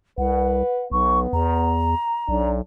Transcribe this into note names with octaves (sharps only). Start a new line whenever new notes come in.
C2 B4 F#5
B1 B3 C#6
E2 A#5
B1 D4